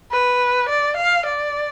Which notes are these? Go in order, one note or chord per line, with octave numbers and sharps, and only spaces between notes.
B4
D5
F5
D5